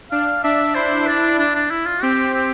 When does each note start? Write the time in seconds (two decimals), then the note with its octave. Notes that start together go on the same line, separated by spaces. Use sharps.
0.11 D4 F5
0.44 D4 E5
0.75 E4 C5
1.07 D4
1.39 D4
1.55 D4
1.71 E4
1.86 F4
2.03 C4 G4
2.34 G4